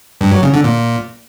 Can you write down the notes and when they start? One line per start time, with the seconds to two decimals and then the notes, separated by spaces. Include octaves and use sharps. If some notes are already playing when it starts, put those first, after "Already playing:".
0.21 G2
0.32 F#3
0.43 C#3
0.53 D3
0.64 A#2